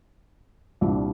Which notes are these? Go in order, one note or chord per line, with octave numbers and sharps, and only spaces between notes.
C2 A#2 G3 D4